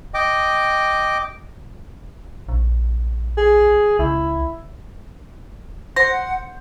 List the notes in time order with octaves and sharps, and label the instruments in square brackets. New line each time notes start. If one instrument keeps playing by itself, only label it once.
[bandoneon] D#5 G5 D6
[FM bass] A#1
[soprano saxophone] G#4
[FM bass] C#2 [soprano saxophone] E4
[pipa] C5 [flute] F#5 [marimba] A#6